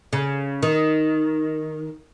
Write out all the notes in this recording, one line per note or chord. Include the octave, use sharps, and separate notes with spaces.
C#3
D#3